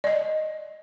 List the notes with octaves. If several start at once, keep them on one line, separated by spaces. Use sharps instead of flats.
D5 D#5